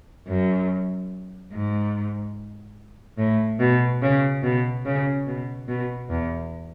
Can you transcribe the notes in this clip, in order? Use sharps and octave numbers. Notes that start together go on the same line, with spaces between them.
F#2
G#2
A2
B2
C#3
B2
C#3
B2
B2
E2